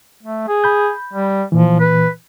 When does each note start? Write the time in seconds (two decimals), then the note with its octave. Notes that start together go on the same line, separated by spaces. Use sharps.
0.23 A3
0.48 G#4
0.64 B5 G6
1.13 G3
1.52 A#2 E3 F3
1.80 B4